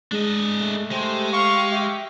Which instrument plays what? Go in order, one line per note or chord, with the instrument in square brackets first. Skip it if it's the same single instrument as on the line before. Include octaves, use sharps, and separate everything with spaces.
[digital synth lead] G#3 [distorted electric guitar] D4 D#5
[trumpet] A3
[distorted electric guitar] G#3 [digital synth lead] G4 [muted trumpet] C5
[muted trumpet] F5 [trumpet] C#6
[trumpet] G4 [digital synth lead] E5